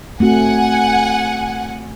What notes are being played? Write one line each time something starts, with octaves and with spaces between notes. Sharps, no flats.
A3 C4 F#4 F#5 G#5